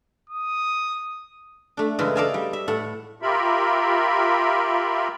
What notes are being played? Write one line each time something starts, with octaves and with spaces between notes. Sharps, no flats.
D#6
A3 D4
F#2 C#3 E3 G#3
A4 D5 D#5 F5 G#5 A5
G3
E5
A2 A4 F#5
F4 G4 A#4 E5 B5